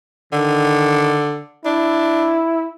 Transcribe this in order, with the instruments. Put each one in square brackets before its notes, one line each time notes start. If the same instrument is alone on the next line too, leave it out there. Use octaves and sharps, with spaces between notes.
[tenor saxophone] D3 [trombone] D#3
[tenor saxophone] D4 [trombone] E4